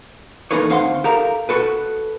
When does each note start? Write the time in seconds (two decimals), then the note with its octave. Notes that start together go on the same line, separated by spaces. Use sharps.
0.51 E3 A#3 D#4 A4 B4 C#5
0.70 D2 C4 F5 F#5 C6
1.04 G4 A4 A#4 F5 A#5
1.49 F#4 A4 B4